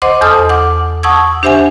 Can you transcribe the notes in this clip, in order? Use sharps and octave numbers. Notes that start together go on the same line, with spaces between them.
C5 D#5 F#5 C6 D6
E2 A4 A5 D#6 F6
F#5 D6
F#5 A5 C#6 D#6 E6 G#6
D4 G4 C5 E5 F#5 G#5